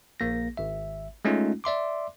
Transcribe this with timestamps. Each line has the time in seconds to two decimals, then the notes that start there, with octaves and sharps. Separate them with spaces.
0.20 A#1 A#3 A#6
0.57 G#1 E5
1.25 G#3 A3 C#4 D#4 F4
1.64 D5 E5 C6 D6